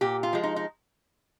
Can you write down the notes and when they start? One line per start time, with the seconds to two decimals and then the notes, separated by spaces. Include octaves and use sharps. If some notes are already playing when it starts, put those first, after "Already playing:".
0.01 A#2 G4
0.23 F4
0.33 F3 G#3
0.43 D#4
0.56 D#4